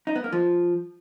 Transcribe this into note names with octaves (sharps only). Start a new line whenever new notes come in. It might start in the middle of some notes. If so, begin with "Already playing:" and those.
D#4
B3
A#3
F3